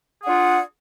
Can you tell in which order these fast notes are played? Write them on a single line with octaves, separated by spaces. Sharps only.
G#4 F#5 D4 F4